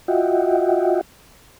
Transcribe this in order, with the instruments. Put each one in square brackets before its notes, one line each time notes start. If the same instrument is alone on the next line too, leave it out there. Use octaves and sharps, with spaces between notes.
[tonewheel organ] F4 F#4 D#5 E5 F#5 G5